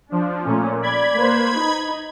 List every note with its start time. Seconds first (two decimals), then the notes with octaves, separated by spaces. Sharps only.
0.12 F3 D4
0.46 A#2 A3 C#4
0.82 D5 B5 G#6
1.16 A#3 B4 C5
1.56 D#4